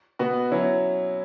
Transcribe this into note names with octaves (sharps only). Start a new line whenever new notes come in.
B2 B3 F#4
F#3 C#4 E4